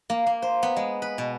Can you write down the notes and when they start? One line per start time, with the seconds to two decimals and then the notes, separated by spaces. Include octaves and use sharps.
0.10 A#3
0.26 A#3
0.42 C5
0.63 B3
0.77 G#3
1.02 B4
1.18 B2